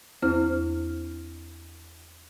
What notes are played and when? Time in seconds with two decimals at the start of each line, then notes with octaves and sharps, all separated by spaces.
0.22 E2 C4 E4 C5 F6